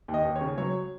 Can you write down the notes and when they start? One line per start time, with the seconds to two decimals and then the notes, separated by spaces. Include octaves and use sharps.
0.08 D#2
0.14 D#5
0.25 D#2
0.36 C#5
0.41 C#3
0.58 F#3 C#5